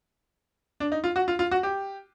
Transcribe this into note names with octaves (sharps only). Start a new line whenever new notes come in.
D4
D#4
F4
F#4
F4
F4
F#4
G4